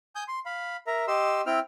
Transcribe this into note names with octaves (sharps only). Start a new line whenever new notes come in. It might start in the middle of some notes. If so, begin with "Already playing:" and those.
G#5 D#6 G6
C6
F5 B5
A#4 E5 A#5
G4 D#5 C6 E6
C4 E4 G5 F6